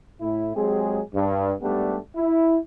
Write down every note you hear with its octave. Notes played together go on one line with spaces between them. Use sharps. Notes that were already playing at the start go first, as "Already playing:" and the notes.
A2 E4
F#3 G#3 C4 G4 G#4
G2
G#2 G3 A3 B3 D4 G4
E4